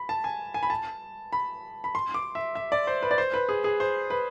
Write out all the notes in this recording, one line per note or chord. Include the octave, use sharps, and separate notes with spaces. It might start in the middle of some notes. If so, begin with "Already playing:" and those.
Already playing: B5
A5
G#5
G#5
B5
A5
B5
B5
C6
D6
E5
E5
D5
C5
B4
D5
C5
B4
G#4
G#4
C5
B4